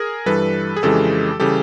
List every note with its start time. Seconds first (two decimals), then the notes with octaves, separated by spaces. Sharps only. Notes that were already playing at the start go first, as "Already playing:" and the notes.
Already playing: G#4 A#4
0.26 G2 E3 G3 A4 B4
0.76 G#4
0.83 F2 C#3 E3 G#3 G4 A4
1.39 C#3 E3 G3 G4 A4